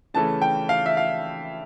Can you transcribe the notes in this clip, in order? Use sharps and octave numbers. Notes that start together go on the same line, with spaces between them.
C#3 E3 A3 C#4 A5
G5
F5
E5
F5